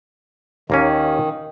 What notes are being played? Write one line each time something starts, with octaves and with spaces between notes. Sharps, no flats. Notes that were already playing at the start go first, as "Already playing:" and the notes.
D#2 D#3 A#3 C#4